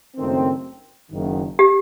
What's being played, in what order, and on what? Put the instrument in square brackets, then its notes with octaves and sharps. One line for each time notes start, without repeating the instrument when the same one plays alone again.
[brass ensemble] F#1 F#2 D#3 A3 C4
F#1 F#2 D#3
[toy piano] G4